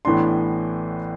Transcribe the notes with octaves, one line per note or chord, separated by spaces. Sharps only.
A1 A2 E3 B3 D4 C6